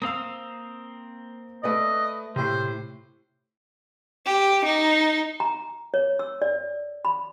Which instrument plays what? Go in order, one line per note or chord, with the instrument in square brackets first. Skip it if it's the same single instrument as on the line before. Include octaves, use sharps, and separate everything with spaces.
[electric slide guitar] A#3 C4 F5 [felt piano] D#6 E6
[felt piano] A3 B4 D5 [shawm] D#5
[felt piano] A2 G4 [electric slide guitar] C3 [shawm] C5
[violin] G4
D#4
[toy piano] A#5
C#5
E6
D5
B5